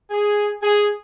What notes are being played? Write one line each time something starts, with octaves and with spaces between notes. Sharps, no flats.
G#4
G#4